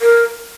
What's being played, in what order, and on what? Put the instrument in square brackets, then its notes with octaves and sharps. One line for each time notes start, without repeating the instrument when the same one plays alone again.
[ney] A#4